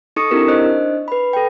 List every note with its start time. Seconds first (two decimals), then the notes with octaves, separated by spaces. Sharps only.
0.16 D#4 A4 C#6 D#6 C#7
0.31 C4 D4 E4 G4 A#4
0.48 D4 D#4 C5 D#5 F#6
1.08 B4 B5
1.33 A4 G5